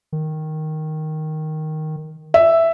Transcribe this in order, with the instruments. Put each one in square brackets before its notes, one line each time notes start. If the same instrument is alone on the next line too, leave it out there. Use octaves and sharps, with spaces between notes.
[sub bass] D#3
[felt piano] E5